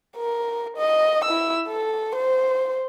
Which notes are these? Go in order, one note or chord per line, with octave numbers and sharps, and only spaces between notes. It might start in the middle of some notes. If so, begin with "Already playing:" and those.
A#4
D#5
E4 E6
A4
C5